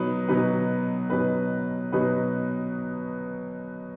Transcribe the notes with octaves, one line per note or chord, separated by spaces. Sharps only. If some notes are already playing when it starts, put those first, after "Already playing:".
Already playing: B2 F#3 D#4 B4
B2 F#3 D#4 B4
B2 F#3 D#4 B4
B2 F#3 D#4 B4